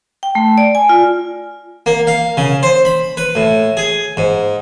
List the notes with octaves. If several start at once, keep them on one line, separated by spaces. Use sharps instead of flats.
G5
A3
D5
G#5
F4
A#3
F5
C#3
C5
B5
B4
A2
G#4
G#2